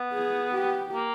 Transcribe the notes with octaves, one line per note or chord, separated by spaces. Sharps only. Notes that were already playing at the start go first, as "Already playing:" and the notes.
Already playing: B3
G#4
G4
A#3